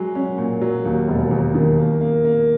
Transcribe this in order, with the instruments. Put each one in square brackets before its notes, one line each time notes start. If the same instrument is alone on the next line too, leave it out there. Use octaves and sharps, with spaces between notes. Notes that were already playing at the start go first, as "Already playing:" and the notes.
Already playing: [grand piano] F#3 G#3
C#4
A#2
F#3
D#2
E1
D#2
D#3
A#3
A#3
A#3